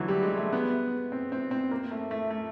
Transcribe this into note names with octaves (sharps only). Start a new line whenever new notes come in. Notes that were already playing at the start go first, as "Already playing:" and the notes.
Already playing: D3 E3 F#3
G3
G#3
A3
B3
C4
C4
C4
A#3
A3
A3
A3